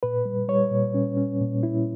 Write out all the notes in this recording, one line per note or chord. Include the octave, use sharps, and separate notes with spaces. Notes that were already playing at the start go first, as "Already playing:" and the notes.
A#2 B4
G3
G3 C#5
A#2
C#4
C#4
A#2
E4